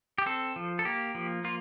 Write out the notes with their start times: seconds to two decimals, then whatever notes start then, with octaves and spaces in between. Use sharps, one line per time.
0.18 G4
0.26 C4 A4
0.56 F3
0.79 A4
0.85 A#3 G4
1.15 F3
1.44 A#3 F4